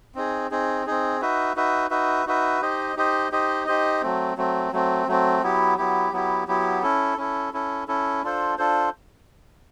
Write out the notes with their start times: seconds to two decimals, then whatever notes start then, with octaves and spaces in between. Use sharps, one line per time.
0.15 C4 D#4 G#4
0.51 C4 D#4 G#4
0.86 C4 D#4 G#4
1.21 D#4 F#4 B4 E5
1.56 D#4 F#4 B4 E5
1.91 D#4 F#4 B4 E5
2.26 D#4 F#4 B4 E5
2.62 D#4 G4 C5 D#5
2.96 D#4 G4 C5 D#5
3.32 D#4 G4 C5 D#5
3.67 D#4 G4 C5 D#5
4.02 F#3 A3 C4
4.37 F#3 A3 C4
4.72 F#3 A3 C4
5.07 F#3 A3 C4
5.42 F#3 B3 E4 G4
5.78 F#3 B3 E4 G4
6.12 F#3 B3 E4 G4
6.47 F#3 B3 E4 G4
6.82 C#4 E4 A4
7.18 C#4 E4 A4
7.53 C#4 E4 A4
7.88 C#4 E4 A4
8.23 D4 F4 A4 C5
8.58 D4 F4 A4 C5